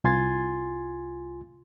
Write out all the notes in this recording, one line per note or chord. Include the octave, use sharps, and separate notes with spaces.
C2 F4 G#5 C6 G#6 A6